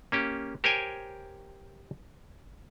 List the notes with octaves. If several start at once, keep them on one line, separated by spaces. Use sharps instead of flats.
A#3 C#4 G4
G4 A#4 C5 C#5 G5 G#5